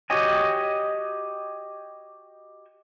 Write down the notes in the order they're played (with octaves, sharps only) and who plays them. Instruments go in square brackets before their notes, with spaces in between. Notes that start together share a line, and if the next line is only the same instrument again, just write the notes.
[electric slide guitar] F#4 G4 C#5 D#5 G#5